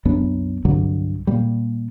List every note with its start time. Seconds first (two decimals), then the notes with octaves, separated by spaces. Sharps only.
0.05 C2 F#2 B3 D4
0.65 C2 G2 D3 F#3
1.27 A#2 G3